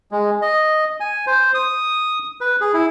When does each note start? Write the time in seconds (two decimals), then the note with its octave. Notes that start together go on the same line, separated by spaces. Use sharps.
0.12 G#3
0.42 D#5
1.00 G#5
1.27 C5
1.54 D#6
2.41 B4
2.61 G#4
2.74 E4